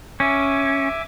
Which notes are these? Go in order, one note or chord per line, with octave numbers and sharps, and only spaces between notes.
C#4 E5 G#5 D6